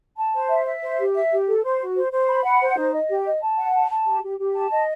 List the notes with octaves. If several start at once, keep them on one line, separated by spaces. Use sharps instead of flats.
A5
C5
E5
E5
C5
G4
E5
G4
A4
C5
F#4
C5
C5
B5
F#5
C5
D#4
D#5
G4
D#5
A5
F#5
A5
A5
G4
G4
G4
A5
D#5